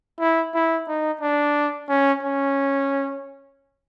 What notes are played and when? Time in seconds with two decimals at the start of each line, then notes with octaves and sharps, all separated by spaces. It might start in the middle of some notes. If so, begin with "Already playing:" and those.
0.20 E4
0.54 E4
0.88 D#4
1.21 D4
1.89 C#4
2.23 C#4